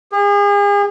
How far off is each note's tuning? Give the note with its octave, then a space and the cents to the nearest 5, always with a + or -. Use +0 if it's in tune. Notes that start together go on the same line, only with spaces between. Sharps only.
G#4 -40